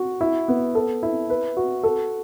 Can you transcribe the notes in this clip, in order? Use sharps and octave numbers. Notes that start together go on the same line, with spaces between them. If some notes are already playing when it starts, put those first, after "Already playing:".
Already playing: F#4
E4
B3
A4
E4
B4
F#4
A4